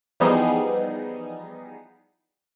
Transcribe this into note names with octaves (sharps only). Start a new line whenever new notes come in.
E3 F3 G3 B3 D#4 G#4